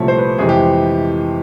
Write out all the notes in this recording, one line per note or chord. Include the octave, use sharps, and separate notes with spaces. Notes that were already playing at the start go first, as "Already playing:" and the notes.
Already playing: C2 A#2 F3 A3 C#5
C5
B4
F2 C3 E3 G#3 C4 G#4
G4